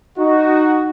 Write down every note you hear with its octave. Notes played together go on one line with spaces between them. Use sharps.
D#4 F#4